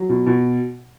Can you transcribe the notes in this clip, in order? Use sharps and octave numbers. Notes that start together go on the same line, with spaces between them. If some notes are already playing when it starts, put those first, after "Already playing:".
Already playing: F#3
B2
B2